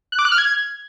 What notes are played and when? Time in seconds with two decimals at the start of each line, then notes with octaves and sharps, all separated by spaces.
0.12 F#6
0.19 D6
0.25 F#6
0.32 F6
0.38 G#6